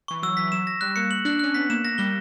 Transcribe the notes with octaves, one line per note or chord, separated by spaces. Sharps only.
E3 C#6
F#3 E6
E3 B6
E3
F#3 E7
A#6
G3 F#6
A#3 C#7
F#7
D4 F#6
C#4 F#6
B3 B6
A#3 E7
A#3 A#6
G3 G7